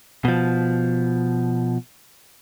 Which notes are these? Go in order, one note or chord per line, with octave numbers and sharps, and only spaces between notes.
B2 F3